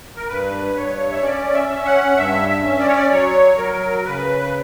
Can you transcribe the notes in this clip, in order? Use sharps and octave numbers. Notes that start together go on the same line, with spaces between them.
A#4
G2 B4
G2 C#5
E5
C#4 D5
E5
C#4
F#5
G2 E5
E5
C#4
D5
C#5
D5
F#3 C#5
F#3 A#4
C#3 B4